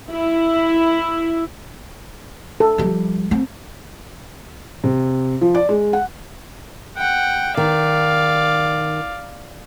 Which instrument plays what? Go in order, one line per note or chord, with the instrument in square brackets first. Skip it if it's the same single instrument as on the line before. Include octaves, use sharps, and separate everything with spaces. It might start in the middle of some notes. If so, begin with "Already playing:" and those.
[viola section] E4
[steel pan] A4
[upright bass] F3 G3
C4
[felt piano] C3
F3
D5
G#3
F#5
[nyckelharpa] F#5 G5
[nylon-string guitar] D#3 [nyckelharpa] D5 F5